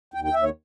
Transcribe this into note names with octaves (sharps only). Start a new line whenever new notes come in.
D#2 G5
G5
D#2 E5
C#5